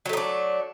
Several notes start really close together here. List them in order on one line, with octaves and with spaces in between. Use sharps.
F#3 A3 D#4 D4